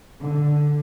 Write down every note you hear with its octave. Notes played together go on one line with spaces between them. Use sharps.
D3